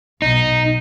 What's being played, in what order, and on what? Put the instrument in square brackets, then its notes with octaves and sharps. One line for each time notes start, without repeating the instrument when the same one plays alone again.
[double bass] B1 B2 [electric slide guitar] D#4